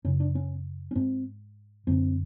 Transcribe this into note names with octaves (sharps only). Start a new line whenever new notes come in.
F#2 C#3 C#4
D4
C#4
C#4
G#2 C4
F#2 D3 C4